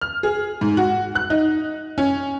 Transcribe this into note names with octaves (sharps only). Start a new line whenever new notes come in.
F6
G#4
G#2
F#4
F#6
D#4
C#4